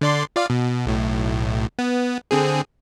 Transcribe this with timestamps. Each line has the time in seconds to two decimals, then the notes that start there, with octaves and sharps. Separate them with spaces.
0.01 D3 D5 C6
0.36 F4 D5 F5
0.50 B2
0.86 B1 A2
1.79 B3
2.31 D3 C4 G#4